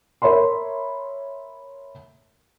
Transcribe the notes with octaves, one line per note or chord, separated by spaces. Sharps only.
A#4 C#5 E5 B5 C6